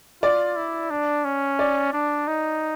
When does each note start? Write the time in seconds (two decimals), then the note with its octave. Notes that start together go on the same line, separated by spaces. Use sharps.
0.22 F4 D5
0.56 E4
0.91 D4
1.24 C#4
1.59 D5
1.93 D4
2.27 D#4